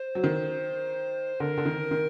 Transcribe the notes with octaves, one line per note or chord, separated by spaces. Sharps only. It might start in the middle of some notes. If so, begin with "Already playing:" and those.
Already playing: C5
F#3
D#3
D3 A#4
D3
D#3
D#3